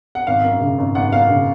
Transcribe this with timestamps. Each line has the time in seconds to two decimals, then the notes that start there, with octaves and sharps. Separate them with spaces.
0.15 F#5
0.27 G#1 F5
0.44 F#2
0.61 C#3
0.78 G#1
0.95 G#1 F#5
1.12 F#2 F5
1.30 C#3